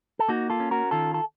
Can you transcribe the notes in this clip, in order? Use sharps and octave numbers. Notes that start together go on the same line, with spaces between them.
A4
A#3 D#4 F#4
F4 A4
C#4
F#4 A#4
D#3 F4 A4
A4